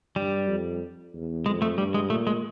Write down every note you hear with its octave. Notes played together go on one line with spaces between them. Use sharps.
G2 G3
F2
E2
F2 G#3
A3
G2 G3
G#3
A#2 A3
G#3